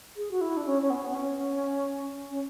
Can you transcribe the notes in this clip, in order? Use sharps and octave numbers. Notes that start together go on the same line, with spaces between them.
G#4
F#4
E4
D4
C#4
C#4
B3
B3
C#4
C#4